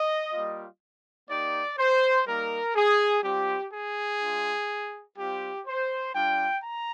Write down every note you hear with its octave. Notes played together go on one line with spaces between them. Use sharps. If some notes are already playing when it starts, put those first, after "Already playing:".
Already playing: D#5
G3 A#3 F4
A#3 D#4 G4 D5
C5
G3 A#3 D#4 A#4
G#4
G3 C4 F4 G4
G#4
G#3 D4 F4
G3 C4 F4 G4
C5
G3 D4 F4 G5
A#5